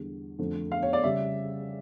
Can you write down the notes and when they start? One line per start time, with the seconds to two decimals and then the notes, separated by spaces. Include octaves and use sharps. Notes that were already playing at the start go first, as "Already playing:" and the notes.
Already playing: E2 D3 G3
0.39 F2 D3 A3
0.72 F5
0.83 C#5
0.93 D5
1.03 C#3 G3 E5